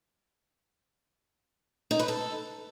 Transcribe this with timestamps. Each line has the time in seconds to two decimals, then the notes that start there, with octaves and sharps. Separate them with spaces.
1.91 D#4
1.99 B4
2.08 A4